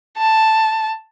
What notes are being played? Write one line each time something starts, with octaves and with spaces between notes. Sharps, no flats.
A5